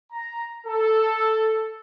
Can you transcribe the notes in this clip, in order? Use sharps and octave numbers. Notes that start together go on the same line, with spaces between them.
A#5
A4